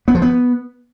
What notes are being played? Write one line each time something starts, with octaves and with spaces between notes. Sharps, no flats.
B3
F3
B3